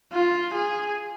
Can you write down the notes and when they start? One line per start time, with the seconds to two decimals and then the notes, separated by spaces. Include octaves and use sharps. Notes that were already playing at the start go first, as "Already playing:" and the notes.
0.13 F4
0.54 G#4